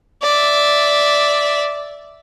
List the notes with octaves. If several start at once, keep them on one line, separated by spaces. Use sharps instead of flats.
D5 E5